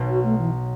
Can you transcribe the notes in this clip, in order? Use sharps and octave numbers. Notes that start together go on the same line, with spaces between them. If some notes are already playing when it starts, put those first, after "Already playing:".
Already playing: B1 B2
F#4
A3
E3